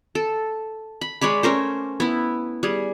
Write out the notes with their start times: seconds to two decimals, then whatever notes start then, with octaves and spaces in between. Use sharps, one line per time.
0.15 A4
1.01 B5
1.21 G#3 C#5 D5 B5
1.43 A3 C#4 A#4 C5
2.00 B3 E4
2.63 G3 G#4